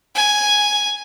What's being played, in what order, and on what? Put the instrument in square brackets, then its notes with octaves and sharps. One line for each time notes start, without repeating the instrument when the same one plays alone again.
[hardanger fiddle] G#5